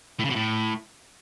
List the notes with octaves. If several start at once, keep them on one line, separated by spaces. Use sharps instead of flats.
A2
C#3
B2
A2